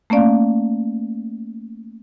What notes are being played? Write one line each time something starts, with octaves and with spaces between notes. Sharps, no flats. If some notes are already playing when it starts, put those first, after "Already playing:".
A3 A#3 C#4 D5 F5